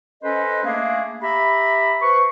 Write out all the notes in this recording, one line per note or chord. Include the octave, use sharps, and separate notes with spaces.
C#4 A4 B4 C5 D#5
A3 A#3 D4 G#4 F5
G4 E5 A#5 B5
B4 C5 C#6